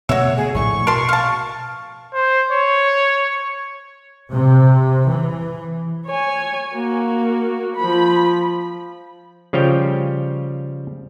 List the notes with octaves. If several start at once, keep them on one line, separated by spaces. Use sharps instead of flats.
B2 D3 A3 F#4 C#5 E5
G#4
A#1 A2 A3 C#6
B2 A#4 A5 C6
F5 A5
C5
C#5
C3
E3
C#5 G#5
A#3 F#4
F3 B5
C#3 F3 G3 C#5 G5